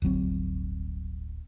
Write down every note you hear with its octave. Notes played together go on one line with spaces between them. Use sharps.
D1 G1 F#3 C4